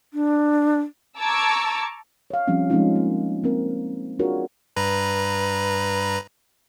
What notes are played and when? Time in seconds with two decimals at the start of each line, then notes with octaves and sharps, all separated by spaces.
0.14 D4
1.18 A5 A#5 C#6 D6 E6 G#6
2.30 C#5 F5
2.48 F3 G3 C4 C#4
2.70 F3 G#3 C4 C#4 D#4 F4
2.96 A#3
3.44 A#3 C4 A#4
4.19 D4 F4 F#4 G#4 A#4 C#5
4.76 G2 B4 A#5